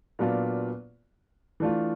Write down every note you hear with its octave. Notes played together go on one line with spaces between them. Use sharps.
A#2 F#3 B3 D4 F4
E3 A3 D4 F4